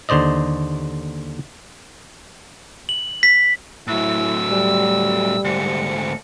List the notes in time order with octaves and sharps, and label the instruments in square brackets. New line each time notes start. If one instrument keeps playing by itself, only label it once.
[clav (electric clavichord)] D#2 D3 C5 D5 D#5
[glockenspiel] F#7
B6
[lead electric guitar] A2 F#3 [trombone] E4 [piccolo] E6
[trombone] G3
[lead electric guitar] D2 G#2 [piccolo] C#7